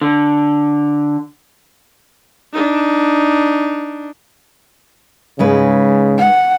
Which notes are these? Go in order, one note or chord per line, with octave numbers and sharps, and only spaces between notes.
D3
D4 D#4
G#2 C#3 G#3 B4
F#5